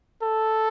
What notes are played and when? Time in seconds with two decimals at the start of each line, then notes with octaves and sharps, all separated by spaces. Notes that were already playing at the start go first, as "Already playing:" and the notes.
0.23 A4